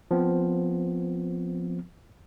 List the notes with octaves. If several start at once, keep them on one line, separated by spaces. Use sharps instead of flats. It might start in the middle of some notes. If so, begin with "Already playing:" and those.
F3 B3 C4